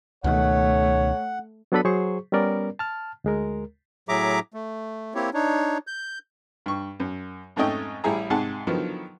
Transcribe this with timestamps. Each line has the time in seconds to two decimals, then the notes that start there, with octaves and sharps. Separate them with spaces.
0.24 C#2 B2 D#3 A3 C#5 F#5
1.72 F#3 B3 D4 A4 B4 B5
1.85 F#3 G#4 C5 C#6
2.32 G3 B3 C#4 A#4 D5
2.79 A5 F6
3.24 D2 G#3 A#4
4.09 A2 F#3 G#4 E5 A#5 D6
4.54 A3
5.15 A#3 C4 E4 G4 C#5
5.34 D4 D#4 C#5
5.87 G6
6.66 G2 C#6
7.00 F#2
7.56 F2 G#2 A3 C#4 D#5 G5
8.04 A1 G3 E4 G#4 A#5
8.30 G#2 C3 G#4 F#5 A5
8.67 D3 D#3 F3 F#3 B3